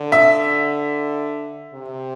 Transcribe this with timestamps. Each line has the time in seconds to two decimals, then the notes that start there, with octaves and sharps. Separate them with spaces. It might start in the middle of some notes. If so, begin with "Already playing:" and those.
Already playing: D3
0.12 E5
1.74 C3